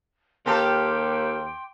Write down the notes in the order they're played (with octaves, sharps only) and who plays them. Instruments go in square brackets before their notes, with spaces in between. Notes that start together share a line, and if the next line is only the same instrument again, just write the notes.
[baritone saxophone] D#2 [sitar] F4 G4 A4 [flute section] G5 C6 D6